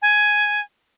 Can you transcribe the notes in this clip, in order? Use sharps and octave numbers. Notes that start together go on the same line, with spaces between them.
G#5